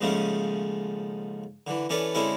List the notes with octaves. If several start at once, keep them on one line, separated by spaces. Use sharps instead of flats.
D#2 G#2 C#3 F3 A3 C#4
D3 E3
E3 C#4 D4 A4 B4
D3 G#3 C4 C#4 E4 A4